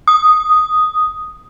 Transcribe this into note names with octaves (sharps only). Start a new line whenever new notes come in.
D#6